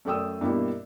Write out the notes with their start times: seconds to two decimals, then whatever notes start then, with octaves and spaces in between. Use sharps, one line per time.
0.05 F#2 A3 D5 G5 D#6 E6
0.41 G2 B2 A#3 E4 G4